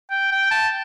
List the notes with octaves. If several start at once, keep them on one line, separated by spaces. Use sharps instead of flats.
G5
G5
A5